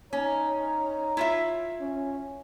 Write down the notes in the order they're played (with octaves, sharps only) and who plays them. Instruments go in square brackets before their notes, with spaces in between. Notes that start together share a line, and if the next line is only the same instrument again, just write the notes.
[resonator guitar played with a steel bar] C#4 [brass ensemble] D#4 C#5 A#5
[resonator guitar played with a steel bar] E4 F4 E5
[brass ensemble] C#4